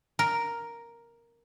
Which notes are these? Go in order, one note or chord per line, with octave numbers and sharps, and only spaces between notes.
A#4